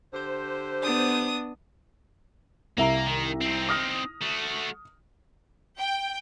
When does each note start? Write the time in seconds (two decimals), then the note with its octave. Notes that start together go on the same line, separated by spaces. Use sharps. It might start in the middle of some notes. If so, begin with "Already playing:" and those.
0.14 D3 G4 C5
0.83 B3 D4 D#6
2.78 C2 A#3 E5 A#5
3.06 D#3
3.41 C4 D#4
3.69 D#6 F6 A#6
4.21 A3 F#4
5.78 G5